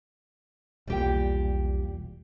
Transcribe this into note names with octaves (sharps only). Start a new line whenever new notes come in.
E1 B1 A#2 G3 G4 G5